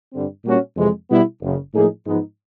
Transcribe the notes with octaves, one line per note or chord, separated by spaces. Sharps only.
G2 D3 G3 C4
A#2 G3 A#3 C#4 F#4
F2 C3 E3 G#3
B2 G3 B3 E4
F#1 F#2 C#3
A2 F3 A#3 D#4 G#4
G#2 F3 G#3 B3 D#4